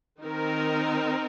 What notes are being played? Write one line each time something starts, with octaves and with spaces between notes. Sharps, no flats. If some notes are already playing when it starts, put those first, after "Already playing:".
D#3 C4 D#4 A#4